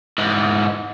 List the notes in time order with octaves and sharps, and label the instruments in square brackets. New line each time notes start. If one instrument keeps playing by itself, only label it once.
[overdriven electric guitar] G#2 E3